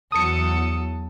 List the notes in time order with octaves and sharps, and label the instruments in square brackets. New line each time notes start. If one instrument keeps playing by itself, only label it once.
[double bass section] E2 F#3 [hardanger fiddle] A4 [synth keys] D#6 C#7